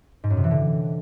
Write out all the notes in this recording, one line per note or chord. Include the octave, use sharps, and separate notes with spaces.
G#2
F#2
C3
E3
D3